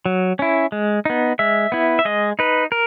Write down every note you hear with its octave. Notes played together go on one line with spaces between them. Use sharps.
F#3
C#4 E4
G#3
B3 D#4
G#3 E5
B3 E4
E5
G#3 D#5
D#4 B4
A#4